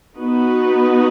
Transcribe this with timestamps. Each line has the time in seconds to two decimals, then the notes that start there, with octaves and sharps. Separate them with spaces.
0.17 B3 D#4 F#4 B4